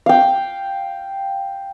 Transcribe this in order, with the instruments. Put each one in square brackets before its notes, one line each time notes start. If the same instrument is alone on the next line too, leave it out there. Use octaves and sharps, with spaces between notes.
[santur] F5 G5